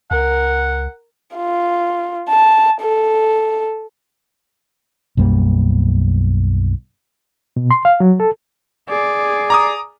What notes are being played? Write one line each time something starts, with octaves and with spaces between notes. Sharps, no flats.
C#2 A#4 F#5
F4
A5
A4
B1 F#2 G3 A#3
B2
C6
F5
F#3
A4
G#4 D5
A#5 D6 D#6